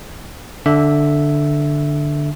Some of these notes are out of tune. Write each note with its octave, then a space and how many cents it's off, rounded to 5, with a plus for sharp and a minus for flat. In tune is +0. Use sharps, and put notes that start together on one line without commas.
D3 +0 D4 +0 E5 +0